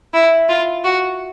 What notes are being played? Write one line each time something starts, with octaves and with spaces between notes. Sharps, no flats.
E4
F4
F#4